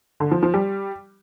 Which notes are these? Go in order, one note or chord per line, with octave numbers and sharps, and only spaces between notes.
D3
F3
F3
G3